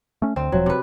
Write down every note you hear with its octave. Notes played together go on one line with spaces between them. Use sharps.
A3 C#4
D2 C4
E1 F3 F#3
C3 B4